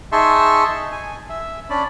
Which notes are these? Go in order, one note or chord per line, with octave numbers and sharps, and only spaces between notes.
D#4 G#4 E5 A5 C6 C#6
G#5
E5
C#4 D4 D5 B5